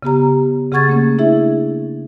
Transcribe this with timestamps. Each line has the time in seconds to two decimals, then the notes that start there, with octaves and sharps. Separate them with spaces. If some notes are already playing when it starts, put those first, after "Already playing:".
0.03 C#3 B3 G4 A#5
0.72 C#3 G#4 F#5 C#6 G#6 A6
0.88 A3 A#3 C#4
1.18 D4 E4 G#4 E5